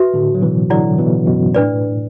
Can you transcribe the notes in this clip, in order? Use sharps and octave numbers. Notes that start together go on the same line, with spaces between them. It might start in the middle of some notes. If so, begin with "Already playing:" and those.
Already playing: F#4 B4 E5
A2 D3
F#3
B2 E3
D3 F#3 E4 D5 F#5
B2 E3
F#2 B2
A2 D4 B4 D5